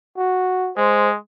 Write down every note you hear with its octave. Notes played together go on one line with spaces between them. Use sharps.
F#4
G#3 C5